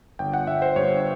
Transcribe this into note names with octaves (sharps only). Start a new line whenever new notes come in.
G1 G5
F#5
G1 E5
C5
G2 C#5